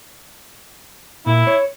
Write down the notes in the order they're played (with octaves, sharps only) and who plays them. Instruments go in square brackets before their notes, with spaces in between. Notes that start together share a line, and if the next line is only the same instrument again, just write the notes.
[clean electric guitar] A#2 [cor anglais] E4
[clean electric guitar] C#5